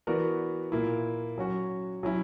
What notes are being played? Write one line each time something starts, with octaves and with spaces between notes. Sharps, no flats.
E3 B3 F#4 A#4 D5
A#2 A#3 E4
F#3 C#4 F#4
F#3 C#4 E4